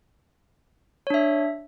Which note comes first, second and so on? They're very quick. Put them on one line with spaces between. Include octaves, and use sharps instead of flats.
C#5 D4 E5